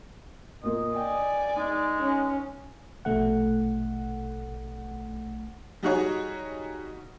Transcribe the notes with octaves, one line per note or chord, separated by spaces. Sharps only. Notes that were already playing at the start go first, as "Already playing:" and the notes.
A#2 A#3 D#5
D5 G5 G#5
G#3 D#4
C#4
A#1 B2 A3 F#5
G3 D#4 F#4 G#4 C#5